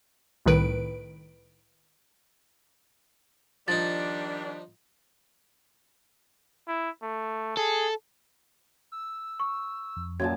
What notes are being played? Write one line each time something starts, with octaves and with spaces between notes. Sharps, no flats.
C2 A2 D#3 B4 D7
D#3 F3 G3 D4 D#4 A6
E4
A3
G#4 A4
E6
C#6
F2
F#2 A#2 F#4 A5 G#6